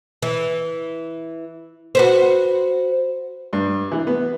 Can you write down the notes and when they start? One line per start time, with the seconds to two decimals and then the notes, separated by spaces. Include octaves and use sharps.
0.22 E3
1.95 F#4 B4 C5
3.53 G2
3.92 E3
4.07 B3